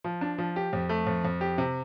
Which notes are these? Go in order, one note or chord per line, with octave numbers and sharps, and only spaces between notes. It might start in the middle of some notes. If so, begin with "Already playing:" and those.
F3
D4
F3
G4
F2
A3
F2
F2
G4
C3